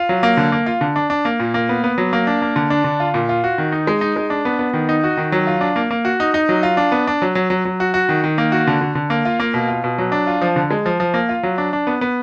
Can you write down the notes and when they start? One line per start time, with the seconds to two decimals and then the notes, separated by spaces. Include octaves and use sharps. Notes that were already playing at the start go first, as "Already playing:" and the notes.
Already playing: F4
0.09 F#3
0.23 A#3
0.37 D3
0.52 A#3
0.66 F4
0.81 D3
0.96 D4
1.10 D4
1.25 A#3
1.40 A#2
1.54 A#3
1.69 B3
1.84 B3
1.98 F#3
2.13 A#3
2.27 D4
2.42 A#3
2.56 D3
2.70 D4
2.84 D3
3.00 F4
3.14 A#2
3.29 F4
3.44 F#4
3.58 D#3
3.72 D#4
3.87 G#3
4.01 D#4
4.16 G#3
4.30 D4
4.45 B3
4.59 B3
4.73 D#3
4.89 D#4
5.04 F#4
5.17 D#3
5.32 F#3
5.47 F4
5.61 D4
5.76 A#3
5.91 A#3
6.05 F#4
6.20 D#4
6.34 D#4
6.49 F#3
6.63 F4
6.77 D4
6.92 B3
7.07 D4
7.22 F#3
7.35 F#3
7.50 F#3
7.65 F#3
7.80 F#4
7.94 F#4
8.09 D#3
8.24 D#3
8.38 A#3
8.52 F#4
8.67 D3
8.81 D3
8.95 D3
9.10 A#3
9.25 F4
9.40 A#3
9.54 B2
9.68 F4
9.84 B2
9.98 F#3
10.12 D4
10.27 F4
10.42 F3
10.56 D3
10.71 G#3
10.86 F3
11.00 F3
11.14 A#3
11.29 F4
11.43 F#3
11.58 D4
11.73 D4
11.87 B3
12.01 B3